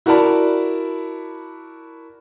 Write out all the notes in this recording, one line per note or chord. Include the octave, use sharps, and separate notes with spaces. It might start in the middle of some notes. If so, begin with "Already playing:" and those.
E4 F#4 A#4 D5 A5 B5